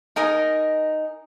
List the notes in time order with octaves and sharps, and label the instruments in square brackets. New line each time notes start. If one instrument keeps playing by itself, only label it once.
[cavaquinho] D#4 A#4 D#5 G#5